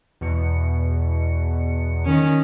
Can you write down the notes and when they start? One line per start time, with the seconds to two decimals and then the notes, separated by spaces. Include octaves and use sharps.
0.21 E2 B2 C#7
2.05 D#3 C#4